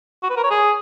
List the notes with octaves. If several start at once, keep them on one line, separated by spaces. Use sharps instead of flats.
F#4
B4
A#4
C#5
G#4